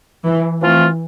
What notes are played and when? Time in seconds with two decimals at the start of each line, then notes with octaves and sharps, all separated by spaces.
0.25 E3
0.60 E3 F3 A3 C4 F4